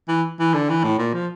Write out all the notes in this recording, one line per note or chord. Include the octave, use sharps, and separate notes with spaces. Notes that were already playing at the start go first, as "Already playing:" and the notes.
E3
E3
D3
E3
A2
A#2
F3